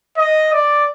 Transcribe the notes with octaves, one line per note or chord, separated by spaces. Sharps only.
D#5
D5